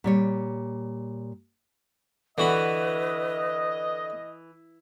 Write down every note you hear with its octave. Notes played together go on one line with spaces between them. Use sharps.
A#2 G3 C#5
D3 E3 F#4 B4 D#5 B5